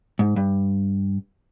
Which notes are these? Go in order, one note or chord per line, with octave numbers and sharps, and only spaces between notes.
G#2
G2